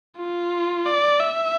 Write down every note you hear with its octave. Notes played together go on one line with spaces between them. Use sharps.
F4
D5
E5